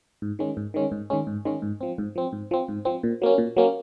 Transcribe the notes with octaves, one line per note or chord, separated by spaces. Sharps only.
G#2
D#3 G#3 C#4
G#2
D#3 G#3 C#4
G#2
D#3 G#3 C#4
G#2
D#3 G#3 C#4
G#2
F3 C4
G#2
F3 C4
G#2
F3 C4
G#2
F3 C4
A#2
F#3 A#3 C#4
A#2
F#3 A#3 C#4